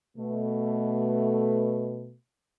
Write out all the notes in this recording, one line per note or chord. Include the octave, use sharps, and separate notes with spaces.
B2 A3